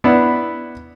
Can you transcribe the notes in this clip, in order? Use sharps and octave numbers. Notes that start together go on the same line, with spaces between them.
B3 D4 E4